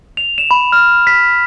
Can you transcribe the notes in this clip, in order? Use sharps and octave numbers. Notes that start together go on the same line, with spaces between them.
F7
E7
B5
F6
B6